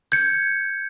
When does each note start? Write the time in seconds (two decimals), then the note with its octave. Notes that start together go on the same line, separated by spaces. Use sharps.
0.12 G6 G#6 C#7